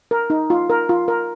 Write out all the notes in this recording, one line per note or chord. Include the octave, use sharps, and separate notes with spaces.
A#4
D#4
F4
A#4
F4
A#4